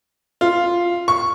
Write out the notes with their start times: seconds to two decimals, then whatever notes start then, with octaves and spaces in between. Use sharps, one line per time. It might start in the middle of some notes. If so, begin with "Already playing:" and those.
0.41 F4
1.08 C#6